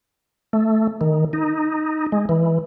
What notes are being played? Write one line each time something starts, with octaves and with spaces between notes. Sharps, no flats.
A3
D#3
D#4
G#3
E3